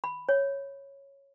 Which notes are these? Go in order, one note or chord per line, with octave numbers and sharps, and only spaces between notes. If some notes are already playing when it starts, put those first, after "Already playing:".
B5
C#5